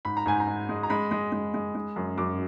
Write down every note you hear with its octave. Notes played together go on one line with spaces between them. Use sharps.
G#2 B5
A#5
G#2 G#5
A#5
G#2
G#3
A#5
G#3 B5
G#3
G#3
G#3
G#3
F#2
F#2 D6